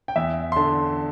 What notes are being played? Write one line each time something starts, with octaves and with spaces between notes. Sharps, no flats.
G5
E2 E5
C6
D3 A5